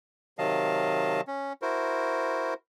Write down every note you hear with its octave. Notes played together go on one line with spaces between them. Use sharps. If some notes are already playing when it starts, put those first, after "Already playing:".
C3 D#3 F#3 D#5 F5 A5
C#4
E4 F#4 A#4 C5